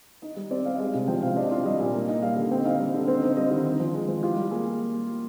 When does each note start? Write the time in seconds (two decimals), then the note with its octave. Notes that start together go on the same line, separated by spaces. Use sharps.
0.22 D#4 D#5
0.36 G3
0.51 C4 D5
0.65 G3 F5
0.75 D#5
0.79 G#3 F5
0.94 C3
1.08 F3 G5
1.22 C3 F5
1.36 D4 D#5
1.51 F4 F5
1.65 G3 D#5
1.80 A#2
1.94 A#3
2.08 D#4
2.22 G3 F5
2.37 D3
2.51 C4 G5
2.65 D#4 F5
2.79 G3
2.94 D3
3.08 C4
3.23 D#4
3.37 G3 D#5
3.51 D#3
3.66 D#4
3.80 F3
3.94 G#3
4.08 F3
4.23 F4 G4
4.37 G3
4.51 A#3 G#4